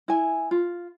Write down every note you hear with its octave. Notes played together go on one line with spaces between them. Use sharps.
E4 G#5
F4